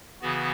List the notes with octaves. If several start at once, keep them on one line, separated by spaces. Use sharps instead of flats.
C#3 E3 B3 F#4